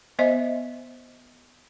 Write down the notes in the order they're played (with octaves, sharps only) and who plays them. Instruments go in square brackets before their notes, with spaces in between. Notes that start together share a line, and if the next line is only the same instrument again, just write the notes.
[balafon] B3 C5 D#5 E5